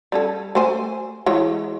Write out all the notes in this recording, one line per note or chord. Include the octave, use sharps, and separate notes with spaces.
G3 C#4 A4
A3 C5 G#5
E3 G#3 C#5